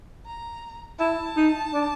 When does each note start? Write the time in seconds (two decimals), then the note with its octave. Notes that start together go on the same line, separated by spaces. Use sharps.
0.26 A#5
0.99 E4 A5
1.37 D#4
1.74 D4